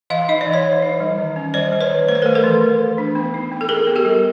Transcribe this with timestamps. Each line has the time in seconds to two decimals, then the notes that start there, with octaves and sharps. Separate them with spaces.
0.10 E3 D#5 F5
0.29 D#4 D#5
0.41 D5
0.47 E3
0.53 C#5 D#5
0.64 E3
0.82 D#4
1.00 G3
1.18 D#3
1.36 C#4
1.54 G3 C5 D5
1.72 G3
1.81 B4 C#5
1.90 D#3
2.08 A3 C5
2.15 B4
2.22 A#4 C5
2.26 A3
2.35 A4 B4
2.44 E3
2.61 A3
2.79 E3
2.98 D4
3.15 B3
3.34 D#4
3.52 B3
3.61 A4
3.69 B3 G#4 A#4
3.87 B3
3.96 G4 A4
4.05 G3